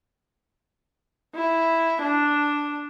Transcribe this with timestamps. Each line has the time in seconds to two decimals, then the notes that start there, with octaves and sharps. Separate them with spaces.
1.35 E4
2.02 D4